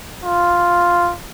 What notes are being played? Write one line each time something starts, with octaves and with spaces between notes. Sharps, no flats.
F4